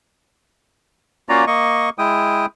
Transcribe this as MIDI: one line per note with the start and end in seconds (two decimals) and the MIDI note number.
1.29 1.45 58
1.29 1.45 61
1.29 1.45 65
1.29 1.45 66
1.29 1.45 74
1.29 1.45 82
1.47 1.90 58
1.47 1.90 75
1.47 1.90 85
1.98 2.46 56
1.98 2.46 64
1.98 2.46 79
1.98 2.46 87